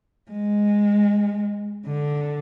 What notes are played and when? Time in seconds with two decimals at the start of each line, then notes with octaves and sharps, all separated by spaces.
0.31 G#3
1.87 D3